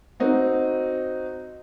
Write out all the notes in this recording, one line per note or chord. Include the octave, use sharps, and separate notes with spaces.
C4 D#4 F#4